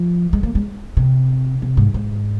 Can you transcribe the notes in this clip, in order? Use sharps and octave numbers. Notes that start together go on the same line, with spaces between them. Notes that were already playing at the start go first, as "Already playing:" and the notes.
Already playing: F3
G#3
A#3
G#3
C3
C3
G#2
G#2